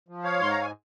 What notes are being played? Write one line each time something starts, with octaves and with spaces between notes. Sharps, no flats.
F3
C#5 F5
G#2 C6
A#5
G#5